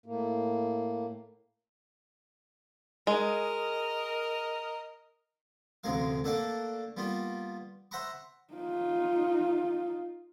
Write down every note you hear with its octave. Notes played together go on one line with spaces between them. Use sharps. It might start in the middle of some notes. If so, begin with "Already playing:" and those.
A2 A#3
G#3 A#4 D#5
A1 D2 C3 G#3 A#4 F5
A3 A#3 D4 A4 D5 F#5
G3 A#3 B3 F4
C5 E5 F#5 A#5 B5 C#6
D#4 F4